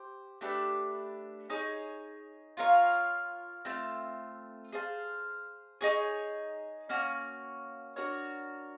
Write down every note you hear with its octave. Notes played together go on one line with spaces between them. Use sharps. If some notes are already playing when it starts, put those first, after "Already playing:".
Already playing: G4 C5
A3 D4 G4 B4
D#4 G#4 C#5
F4 A#4 C#5 F5
A3 C4 F4
G#4 C5 F5 A5
D#4 G#4 C#5
A#3 C#4 F#4
D4 F#4 A#4 C#5